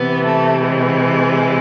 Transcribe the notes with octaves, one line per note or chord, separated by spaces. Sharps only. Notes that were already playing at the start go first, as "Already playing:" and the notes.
Already playing: C3 E3 B3
A3
G#3